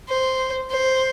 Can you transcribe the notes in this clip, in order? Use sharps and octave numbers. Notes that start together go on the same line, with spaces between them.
C5
C5